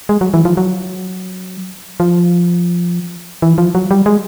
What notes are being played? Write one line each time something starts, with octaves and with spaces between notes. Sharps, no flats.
G#3
F#3
E3
F3
F#3
F3
E3
F3
F#3
G3
G#3